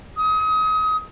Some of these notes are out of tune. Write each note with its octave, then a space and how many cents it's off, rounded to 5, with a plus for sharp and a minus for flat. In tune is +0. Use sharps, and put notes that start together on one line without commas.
D#6 +30